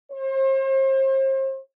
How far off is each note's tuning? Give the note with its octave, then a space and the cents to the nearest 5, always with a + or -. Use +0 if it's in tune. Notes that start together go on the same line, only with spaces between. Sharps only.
C5 +40